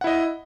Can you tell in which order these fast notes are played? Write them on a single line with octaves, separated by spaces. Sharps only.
F#5 E4 D#5